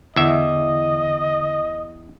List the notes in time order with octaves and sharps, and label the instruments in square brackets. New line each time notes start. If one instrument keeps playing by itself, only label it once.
[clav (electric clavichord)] E2 E5 [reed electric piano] D3 [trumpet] D#5